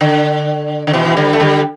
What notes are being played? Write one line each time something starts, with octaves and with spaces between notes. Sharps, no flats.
D3
D3
B2 E3
E3
D3 G3
A3
D3 G3